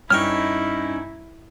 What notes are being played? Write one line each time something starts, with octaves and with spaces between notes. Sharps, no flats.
G2 C#4 D#4 E4 G5 C#6 F6